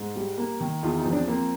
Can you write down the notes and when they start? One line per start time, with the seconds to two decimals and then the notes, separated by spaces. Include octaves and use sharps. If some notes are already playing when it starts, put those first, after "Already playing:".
Already playing: G#2
0.16 G3
0.38 A#3
0.60 D#3
0.83 E2 D#4 F4
0.98 D#4 F4
1.06 F3
1.13 C4 D4
1.28 A#3 C4